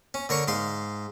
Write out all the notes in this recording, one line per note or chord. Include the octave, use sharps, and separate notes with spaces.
C#4
D3 A#4 C#5 C#6
G#2 F5 C6